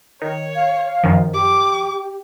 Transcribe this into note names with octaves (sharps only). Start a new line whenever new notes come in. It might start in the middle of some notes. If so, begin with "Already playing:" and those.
D#3 C#5
F5
F#2 D#3 F3
G4 D6